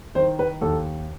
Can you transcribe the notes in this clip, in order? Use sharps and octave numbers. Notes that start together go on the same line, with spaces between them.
D#3 C5
B4
D#2 A4